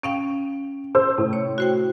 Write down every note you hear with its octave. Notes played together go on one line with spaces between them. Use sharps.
C#4 F5 G5 D7
C5 E6
A2 C3
C#5
F#4 C5 G5